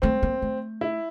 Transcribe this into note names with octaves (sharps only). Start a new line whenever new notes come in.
A3 C4
A#3
A3
E4